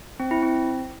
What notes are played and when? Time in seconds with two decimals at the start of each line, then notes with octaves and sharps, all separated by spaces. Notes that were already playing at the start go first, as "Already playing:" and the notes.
0.20 C4
0.31 E4
0.42 C4